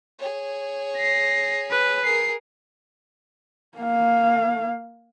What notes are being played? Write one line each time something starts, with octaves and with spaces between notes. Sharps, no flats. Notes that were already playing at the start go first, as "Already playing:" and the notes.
G#4 C#5
A#6 C7
B4
G#4 A#4 C7
A#3 F5